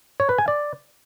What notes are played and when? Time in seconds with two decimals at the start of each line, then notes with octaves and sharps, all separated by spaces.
0.20 C#5
0.29 B4
0.38 G#5
0.48 D5